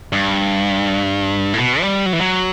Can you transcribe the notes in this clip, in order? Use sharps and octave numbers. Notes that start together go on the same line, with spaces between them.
G2
A2
B2
G3
F#3
E3
F#3